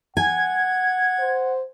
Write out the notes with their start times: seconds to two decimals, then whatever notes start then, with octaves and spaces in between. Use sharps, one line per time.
0.17 F#5 G#5 G#6
1.20 C5